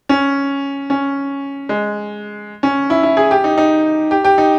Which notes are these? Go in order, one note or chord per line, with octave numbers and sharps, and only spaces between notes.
C#4
C#4
G#3
C#4
E4
E4
G#4
G4
D#4
D#4
G4
G4
D#4